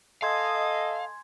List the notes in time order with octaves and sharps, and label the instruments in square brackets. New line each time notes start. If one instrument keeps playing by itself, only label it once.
[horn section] A4 D#5 [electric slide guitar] F5 [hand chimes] G#5 C6 G#6